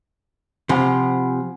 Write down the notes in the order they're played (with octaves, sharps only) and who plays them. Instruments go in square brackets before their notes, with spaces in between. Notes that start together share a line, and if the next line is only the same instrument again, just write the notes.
[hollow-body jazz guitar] C3 F3 [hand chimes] F#5 G#5 B5